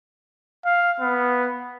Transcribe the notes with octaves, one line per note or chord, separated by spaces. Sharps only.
F5
B3